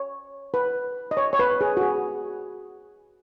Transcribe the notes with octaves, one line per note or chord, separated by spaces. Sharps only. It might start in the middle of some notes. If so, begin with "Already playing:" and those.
Already playing: C#5
B4
D#5
C#5
C#5
B4
G#4
F#4
G#4